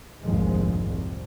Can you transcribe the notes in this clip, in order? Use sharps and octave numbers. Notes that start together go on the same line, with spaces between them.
F1 A#1 D#2 G#2 F3 G#3
C2